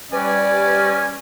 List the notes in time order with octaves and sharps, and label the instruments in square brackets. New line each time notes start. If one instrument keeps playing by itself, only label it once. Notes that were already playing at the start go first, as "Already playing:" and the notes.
[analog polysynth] G3 G4 B4 [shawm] C#4 [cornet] D5 [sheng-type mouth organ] G#5